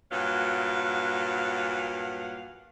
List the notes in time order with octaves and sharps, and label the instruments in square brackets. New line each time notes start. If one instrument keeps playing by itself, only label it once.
[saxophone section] G2 A#2 F#3 F5 F#5